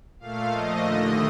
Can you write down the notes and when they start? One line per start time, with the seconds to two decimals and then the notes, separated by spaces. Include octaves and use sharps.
0.20 A#2 A3 F5
0.51 A#2 F3 A3 D#5
0.82 D#2 D3 A3